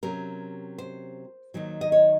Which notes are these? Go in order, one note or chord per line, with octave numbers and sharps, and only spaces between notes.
C3 F#3 C#4 A#4
C5
D#2 D#3 F#3
D#5
C#5